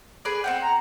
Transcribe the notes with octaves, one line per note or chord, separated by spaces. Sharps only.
G#4 B4 D5
C4 C#4 F#5 G5
A#5